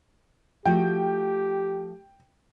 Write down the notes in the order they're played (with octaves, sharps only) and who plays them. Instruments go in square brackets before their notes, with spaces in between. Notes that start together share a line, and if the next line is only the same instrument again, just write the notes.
[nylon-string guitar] F3 A3 F#4 [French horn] G4 [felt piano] G5